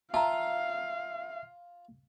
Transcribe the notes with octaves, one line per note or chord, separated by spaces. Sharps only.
F4 E5 F5 A5 A#5